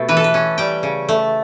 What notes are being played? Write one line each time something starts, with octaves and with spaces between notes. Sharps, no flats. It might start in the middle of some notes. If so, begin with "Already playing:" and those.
Already playing: B2 A3 G4
E3 B4
A4
B4
C#4
G3 G5
C#3
A3